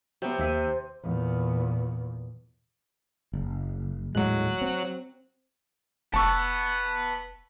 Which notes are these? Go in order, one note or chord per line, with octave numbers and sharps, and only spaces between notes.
C3 F#3 B3
D#2 E5 D#7
E2 A#2
F#1
D#1 A2 F#3 G#3 F#6
C4
F1 B4 F#5 A5 C#6 E6